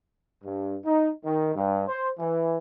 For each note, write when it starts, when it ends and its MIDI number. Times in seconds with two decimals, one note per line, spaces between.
0.44 0.76 43
0.85 1.10 63
1.25 1.53 51
1.55 1.87 43
1.88 2.10 72
2.19 2.57 52